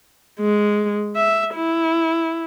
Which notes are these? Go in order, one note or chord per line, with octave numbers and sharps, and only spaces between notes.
G#3
E5
E4